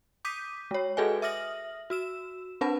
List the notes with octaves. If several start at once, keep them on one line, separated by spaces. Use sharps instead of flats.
D6 D#6 G6 B6 D#7
G#3 C#5
F#4 G#4 A4 B4 D#5 G#5
E5 D#6 F6 A#6 F#7
F#4 E6 E7
C4 D4 B4 F#5 A5